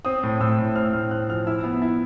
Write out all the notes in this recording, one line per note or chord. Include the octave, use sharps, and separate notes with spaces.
C4 D#6
A2
A2 E6
A2
C4 F6
A2 F6
C4 F#6
F3 F6
E4 E6
B3
E4